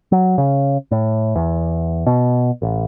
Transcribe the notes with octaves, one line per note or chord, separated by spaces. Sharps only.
F#3
C#3
A2
E2
B2
A1